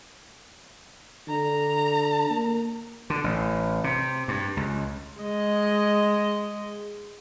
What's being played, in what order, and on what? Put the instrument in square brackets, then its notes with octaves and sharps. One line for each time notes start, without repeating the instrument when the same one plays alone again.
[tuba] D3 [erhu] A#5
[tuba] A#3
[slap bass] D3
A1
C3
G2
C#2
[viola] G#3 D#5